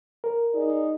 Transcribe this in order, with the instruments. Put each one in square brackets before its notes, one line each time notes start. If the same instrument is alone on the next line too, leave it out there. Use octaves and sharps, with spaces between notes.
[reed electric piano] A#4
[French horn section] D#4 G#4 D5